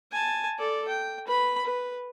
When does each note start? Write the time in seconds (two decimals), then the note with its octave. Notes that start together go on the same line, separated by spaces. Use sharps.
0.12 G#5 A5
0.58 A4 D5
0.89 G5
1.27 B4 B5
1.65 B4